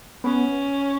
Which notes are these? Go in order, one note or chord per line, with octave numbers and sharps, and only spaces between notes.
B3 C#4